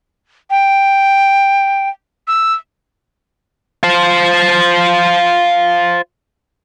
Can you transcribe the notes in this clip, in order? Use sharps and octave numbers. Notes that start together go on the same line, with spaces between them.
G5
E6
F4 C5